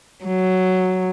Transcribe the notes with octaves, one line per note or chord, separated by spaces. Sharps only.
F#3